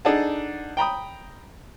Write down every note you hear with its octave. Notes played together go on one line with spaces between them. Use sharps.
D4 D#4 G#4 A4 F#5 A5
G5 A#5 B5 D#6